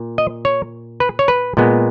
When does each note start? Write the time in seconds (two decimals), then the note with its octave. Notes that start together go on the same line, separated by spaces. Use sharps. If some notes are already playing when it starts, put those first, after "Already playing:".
Already playing: A#2
0.18 D#5
0.45 C#5
1.00 B4
1.19 C#5
1.28 B4
1.57 A#2 G#3 B3